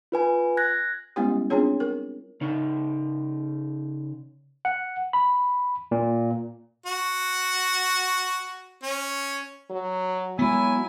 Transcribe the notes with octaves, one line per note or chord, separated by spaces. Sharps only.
F4 B4 G#5
F#6 G#6 A#6
G3 G#3 B3 C#4 E4 G4
C4 D4 F4 G#4 C#5
A#4
C#3 D#4
F#5
B5
A#2
F#4
C#4
F#3
F#3 G#3 B3 E4 G#5